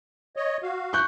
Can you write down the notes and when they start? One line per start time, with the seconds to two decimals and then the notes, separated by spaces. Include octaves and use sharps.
0.36 C#5 D#5
0.63 F#4 F5
0.93 C#6 F#6 G6